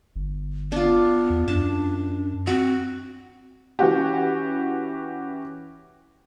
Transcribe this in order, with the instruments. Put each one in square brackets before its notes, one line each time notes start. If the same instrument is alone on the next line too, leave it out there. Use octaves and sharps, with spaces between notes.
[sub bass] G1
[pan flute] B3 [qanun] D4 F4
[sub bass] E2
[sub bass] F#2 [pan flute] D4 [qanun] A5
[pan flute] C4 [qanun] F#4
[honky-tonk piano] E3 C#4 F#4 G4